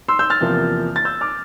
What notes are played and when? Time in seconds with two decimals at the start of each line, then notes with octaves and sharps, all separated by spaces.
0.08 C6 E6
0.19 E6 G6
0.30 F6 A6
0.41 E2 C3 F3 A#3
0.96 A6
1.05 E6 G6
1.21 D6 F6